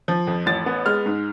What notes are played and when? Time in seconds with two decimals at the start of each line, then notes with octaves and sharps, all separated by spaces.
0.08 F3
0.27 F2
0.46 A1 A6
0.66 B3
0.86 G#3 F6
1.06 G#2